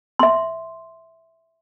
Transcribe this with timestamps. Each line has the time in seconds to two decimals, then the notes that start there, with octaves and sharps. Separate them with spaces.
0.19 E5 C6